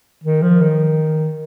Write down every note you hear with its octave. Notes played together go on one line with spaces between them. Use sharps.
D#3
F3
D#3